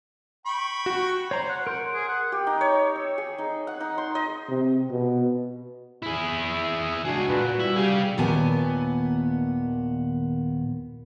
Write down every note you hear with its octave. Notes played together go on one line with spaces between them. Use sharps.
G5 B5 C#6
F#4
C5 C#5 A#5
F#5
A#4 C6 G6
G#4
F#5
G4
D#4
C#5
E6
G#4
D#4
F#5
D#4
C6
D#5
C3
B2
E4 G#4
C#2 D4 F#4 G#4
A#2 B4
G3 E4
G4 G#4 F5
D#2 A#2 D#3 B3 G#5 A5